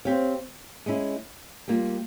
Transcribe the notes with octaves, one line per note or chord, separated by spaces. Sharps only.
C4 G4 C#5 F5
G#3 C#4 E4
G3 A#3 F4